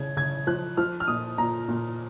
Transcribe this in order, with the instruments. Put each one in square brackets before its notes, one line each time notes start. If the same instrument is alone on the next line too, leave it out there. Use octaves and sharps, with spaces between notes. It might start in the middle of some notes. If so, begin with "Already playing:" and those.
Already playing: [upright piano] C#3 G#6
C#3 G#6
F3 F#6
F3 F6
F6
A#2 D#6
A#2 A#5
A#2